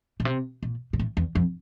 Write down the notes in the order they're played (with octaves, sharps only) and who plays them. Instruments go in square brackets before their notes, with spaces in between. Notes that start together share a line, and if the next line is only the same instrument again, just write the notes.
[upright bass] A#2
C3
A#2
A#2
A2
E2
F2